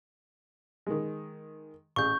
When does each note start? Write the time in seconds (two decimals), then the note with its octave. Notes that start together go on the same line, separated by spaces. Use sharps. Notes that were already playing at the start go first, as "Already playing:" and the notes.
0.87 D#3 G#3
1.96 A1 G#4 C#6 G6